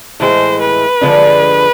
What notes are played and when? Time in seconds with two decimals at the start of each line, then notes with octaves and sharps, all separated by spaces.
0.20 A2 E3 G#3 C5
0.61 B4
1.01 D3 F3 G#3 D4